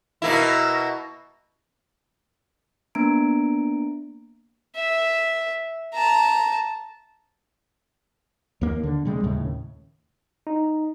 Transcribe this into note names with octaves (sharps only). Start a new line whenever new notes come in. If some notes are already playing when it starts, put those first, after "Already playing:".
B2 A#3 E4
A#3 B3 D4 A#5 D7
E5
A5 A#5
D#2 A#3
D3
C3 G3 G#3
D#2 A2 C#3
D#4